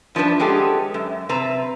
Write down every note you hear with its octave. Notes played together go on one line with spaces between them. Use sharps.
G2 F3 C4 D4 B4
G#3 B3 C#4 G4 A4
F#2
C3 C4 B4 A#5